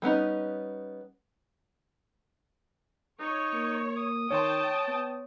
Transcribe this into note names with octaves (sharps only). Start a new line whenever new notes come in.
G3 B3 C#4 D#4
D#4 C#5
A#3
D#6
D#3 C#5 G5 A5 C6
B3